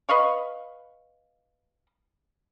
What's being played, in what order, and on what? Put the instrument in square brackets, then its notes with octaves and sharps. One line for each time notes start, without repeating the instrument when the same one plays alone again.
[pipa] B4 D#5 F5 C#6